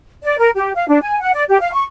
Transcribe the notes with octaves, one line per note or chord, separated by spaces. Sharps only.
D5
A#4
G4
F5
D4
G#5
F#5
D5
G4
F5
C#6